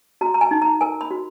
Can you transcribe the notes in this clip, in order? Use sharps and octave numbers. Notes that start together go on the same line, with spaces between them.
F#4 A#5
A#5
G#5
D#4
A#5
A#4 G#5
B5
F#4